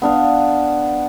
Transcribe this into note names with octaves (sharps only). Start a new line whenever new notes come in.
B3 D4 F5